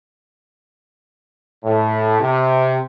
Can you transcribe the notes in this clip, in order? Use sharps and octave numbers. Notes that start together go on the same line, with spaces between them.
A2
C3